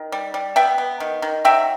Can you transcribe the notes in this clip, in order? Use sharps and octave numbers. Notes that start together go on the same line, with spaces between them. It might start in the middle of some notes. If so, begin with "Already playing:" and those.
Already playing: D#3
G3
G3
B3 E5 G5
B3
D#3
D#3
F#3 E5 G5